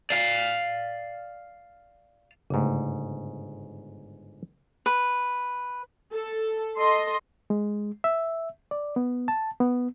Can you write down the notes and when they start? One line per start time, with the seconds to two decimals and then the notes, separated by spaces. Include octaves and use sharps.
0.10 D5 F5
2.50 G1 G#2 C#3 A3
4.86 B4
6.13 A4
6.78 A4 D#5 C6
7.50 G#3
8.04 E5
8.71 D5
8.96 B3
9.28 A5
9.60 B3